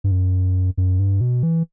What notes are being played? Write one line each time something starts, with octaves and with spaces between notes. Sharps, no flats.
G2
F#2
F#2
G2
B2
E3